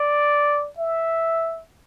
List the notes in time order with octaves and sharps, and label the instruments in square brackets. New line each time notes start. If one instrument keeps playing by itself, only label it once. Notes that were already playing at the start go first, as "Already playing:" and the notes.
Already playing: [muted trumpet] D5
E5